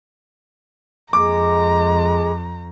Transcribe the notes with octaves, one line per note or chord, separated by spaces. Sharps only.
F2 G#3 A#5 D6